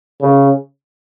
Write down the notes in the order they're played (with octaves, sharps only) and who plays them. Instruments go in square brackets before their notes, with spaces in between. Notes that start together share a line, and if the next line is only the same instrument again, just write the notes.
[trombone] C#3